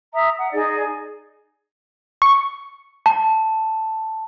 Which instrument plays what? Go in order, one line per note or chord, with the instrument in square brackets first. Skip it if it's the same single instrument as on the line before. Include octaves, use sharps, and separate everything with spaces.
[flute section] E5 A#5 D#6
F#5
D#4 G#4 D5
[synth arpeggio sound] C#6
[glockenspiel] A5